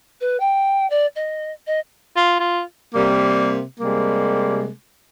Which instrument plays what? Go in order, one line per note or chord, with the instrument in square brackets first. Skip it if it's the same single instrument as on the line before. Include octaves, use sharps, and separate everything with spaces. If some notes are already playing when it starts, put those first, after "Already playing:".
[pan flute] B4
G5
D5
D#5
D#5
[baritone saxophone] F4
F4
[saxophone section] C3 G3 A#3
C3 G3 G#3 A#3